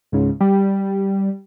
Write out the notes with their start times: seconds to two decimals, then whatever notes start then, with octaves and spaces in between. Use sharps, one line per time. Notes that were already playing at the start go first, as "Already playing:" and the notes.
0.12 C#2 G#2 C#3
0.41 G3